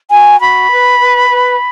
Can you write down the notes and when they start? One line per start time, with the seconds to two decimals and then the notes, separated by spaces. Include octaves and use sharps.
0.11 F#4 G#5
0.41 F#4 B5
0.71 B4
1.00 B4
1.30 B4